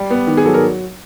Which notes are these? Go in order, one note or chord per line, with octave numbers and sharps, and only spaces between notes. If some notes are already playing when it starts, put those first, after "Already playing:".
Already playing: G3 D5
B3
D#3
G#4
F#3 A4
A#4